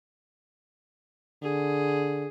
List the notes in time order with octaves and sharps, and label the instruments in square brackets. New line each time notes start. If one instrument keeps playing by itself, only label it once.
[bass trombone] D3 [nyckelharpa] G#4